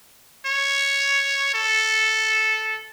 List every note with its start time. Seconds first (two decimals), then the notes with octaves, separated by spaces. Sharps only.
0.46 C#5
1.54 A4